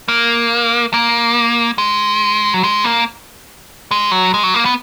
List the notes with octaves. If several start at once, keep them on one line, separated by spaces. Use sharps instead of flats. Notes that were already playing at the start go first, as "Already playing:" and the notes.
A#3
A#3
G#3
F#3
G#3
A#3
G#3
F#3
G#3
F#3
A#3
B3